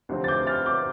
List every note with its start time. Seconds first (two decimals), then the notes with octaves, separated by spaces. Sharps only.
0.09 D2 C3 F3 C4
0.24 A6
0.28 D6 G6
0.47 F6 A6
0.66 D6 G6